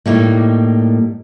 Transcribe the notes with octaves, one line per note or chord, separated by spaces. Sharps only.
A2 G3 A#3 D#4 C#5